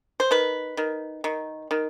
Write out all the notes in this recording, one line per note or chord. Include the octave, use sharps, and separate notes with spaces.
C5
D#3 B4
D#3
D#3
D#3